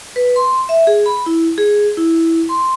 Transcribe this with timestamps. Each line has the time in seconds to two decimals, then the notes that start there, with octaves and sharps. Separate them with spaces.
0.16 B4
0.36 C6
0.69 E5
0.87 G#4
1.06 B5
1.26 E4
1.58 G#4
1.97 E4
2.49 C6